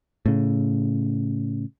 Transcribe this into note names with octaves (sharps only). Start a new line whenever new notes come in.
A2 C#3